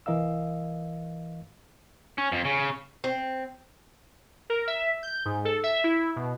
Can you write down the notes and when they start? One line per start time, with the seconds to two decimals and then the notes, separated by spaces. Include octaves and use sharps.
0.06 C2 E3 A#4 D#5 F5 E6
2.18 C#4
2.32 F2
2.45 C#3
3.04 C4
4.50 A#4
4.68 E5
5.03 G6
5.26 G#2
5.45 A4
5.64 E5
5.84 E4
6.16 B2